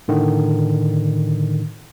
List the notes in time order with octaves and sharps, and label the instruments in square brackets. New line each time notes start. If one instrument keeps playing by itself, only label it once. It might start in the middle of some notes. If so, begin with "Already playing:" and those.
[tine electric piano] A2 D3 D#3